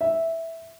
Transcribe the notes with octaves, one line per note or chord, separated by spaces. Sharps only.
E5